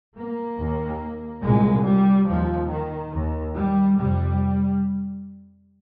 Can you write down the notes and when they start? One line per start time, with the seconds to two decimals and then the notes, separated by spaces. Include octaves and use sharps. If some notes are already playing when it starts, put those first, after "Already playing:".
0.17 A#3
0.59 D#2
1.44 C2 A#2 G#3
1.87 G3
2.28 D#2 F3
2.71 D#3
3.13 D#2
3.56 G3
3.98 F2 C3 G3